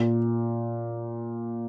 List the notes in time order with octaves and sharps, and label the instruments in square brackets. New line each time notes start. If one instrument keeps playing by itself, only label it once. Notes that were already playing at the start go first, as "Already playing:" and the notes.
Already playing: [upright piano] A#2